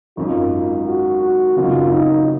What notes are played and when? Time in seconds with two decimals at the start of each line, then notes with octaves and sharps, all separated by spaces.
0.17 G#1 F#2 D#3 F4
0.52 F4
0.87 F#4
1.22 F#4
1.57 F#1 F#2 D#3 F#3 C4 F4
1.92 D#4